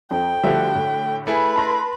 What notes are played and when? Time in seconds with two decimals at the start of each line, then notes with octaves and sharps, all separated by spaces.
0.11 F2 G5
0.43 D3 F3 G3 A3 F#4 E5
0.75 A2
1.27 A3 E4 G#4 B4 B5
1.56 A5 C6 A#6